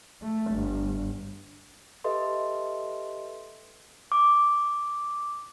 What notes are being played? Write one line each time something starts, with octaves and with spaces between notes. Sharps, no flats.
A3
G1
G4 A4 B4 D#5 E5 C6
D6